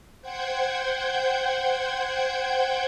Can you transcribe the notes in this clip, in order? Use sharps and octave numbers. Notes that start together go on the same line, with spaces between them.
C5 F#5 G5 G6 G#6